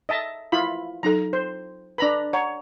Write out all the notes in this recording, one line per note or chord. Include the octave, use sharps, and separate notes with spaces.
D#5 E5 A5
E4 F4 B5
F#3 D#4 A4 A#5
C5
D4 B4 A#5 B5
C#5 F#5 A#5